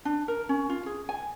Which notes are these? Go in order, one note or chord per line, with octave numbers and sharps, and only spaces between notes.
D4
A#4
C#4
F4
G#4
G#5